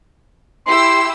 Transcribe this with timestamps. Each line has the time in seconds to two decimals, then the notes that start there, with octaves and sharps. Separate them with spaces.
0.67 E4 G4 C6 E6